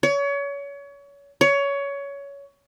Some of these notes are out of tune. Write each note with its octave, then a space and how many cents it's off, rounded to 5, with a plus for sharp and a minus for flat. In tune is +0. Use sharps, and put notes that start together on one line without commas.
C#5 +30
C#5 +20